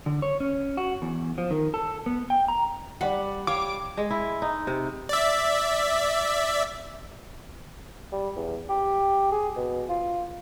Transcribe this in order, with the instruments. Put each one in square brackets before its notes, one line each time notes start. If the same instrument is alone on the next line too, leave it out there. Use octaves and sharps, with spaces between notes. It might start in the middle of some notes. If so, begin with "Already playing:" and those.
[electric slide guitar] D3
C#5
C#4
F#4
E2
F3
D#3
A4
B3
G5
A#5
[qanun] G3 B5 [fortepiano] D5 F#5
[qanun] G3 C#5 [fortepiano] F5 [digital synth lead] D6
[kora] G#3
E4
D#4
C3
[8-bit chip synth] D5 E5
[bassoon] G3
E2
G4
G#4
B2
F4